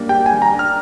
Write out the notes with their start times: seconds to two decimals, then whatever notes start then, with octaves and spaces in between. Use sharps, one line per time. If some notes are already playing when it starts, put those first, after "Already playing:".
Already playing: G3 A#3 D4
0.09 G4 G5
0.26 G#5
0.32 G3
0.42 A#5
0.53 D4
0.59 F6